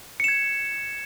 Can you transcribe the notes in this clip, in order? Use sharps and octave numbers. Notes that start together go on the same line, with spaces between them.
G#6 C#7 E7